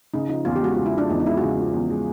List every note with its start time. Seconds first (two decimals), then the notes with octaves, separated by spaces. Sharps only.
0.14 C#3 D#4
0.29 F3 D#4
0.45 E2 F4
0.56 G4
0.61 G#3 F#4
0.74 F4
0.78 C#3
0.86 E4
0.94 F3 D4
1.10 E2 D#4
1.20 D#4
1.26 G#3 E4
1.37 F#4
1.41 C#3 F4
1.58 F3
1.74 E2
1.90 G#3